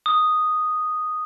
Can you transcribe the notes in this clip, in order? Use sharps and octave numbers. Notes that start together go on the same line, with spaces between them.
D#6